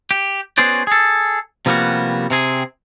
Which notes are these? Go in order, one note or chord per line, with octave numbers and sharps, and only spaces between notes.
G4
B3 C#4 F#4 G#4 C5 D5
G#4 A4
C3 F3 G3 A#3 B3 F#4
C3 C4 G#4